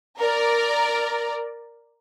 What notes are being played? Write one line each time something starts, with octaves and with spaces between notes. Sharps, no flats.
A#4 D5